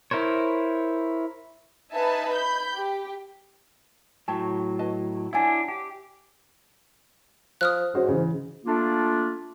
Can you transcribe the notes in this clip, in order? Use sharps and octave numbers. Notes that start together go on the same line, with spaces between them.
E4 A#4 C5 C#5
D#4 B4 E5 G#5 A5
B5 G6
G4
A2 F#3 C#5 G5 A5
B4 D#5 A5
D4 E4 C#5 F#5 G#5
G4
F3 D#6 F6 F#6
G#2 C#4 F#4 C5
C#3 E3
A3 A#3 D4 F4